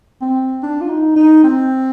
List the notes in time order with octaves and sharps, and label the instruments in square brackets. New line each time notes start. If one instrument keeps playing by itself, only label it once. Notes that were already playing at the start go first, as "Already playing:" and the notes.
[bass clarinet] C4
D4
F4
D#4
D#4
C4